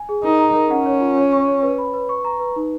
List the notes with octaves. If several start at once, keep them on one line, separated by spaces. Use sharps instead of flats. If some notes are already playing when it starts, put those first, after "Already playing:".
Already playing: G#5
G#4
D#4 A#4
A#5
A#4
C#4 F#5
C#5
F4
C#5
C#6
C#5
B4
B5
B4
C#6
A#5
B4
D#4